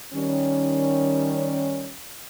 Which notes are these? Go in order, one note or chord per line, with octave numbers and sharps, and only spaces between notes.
D#3 G3 C#4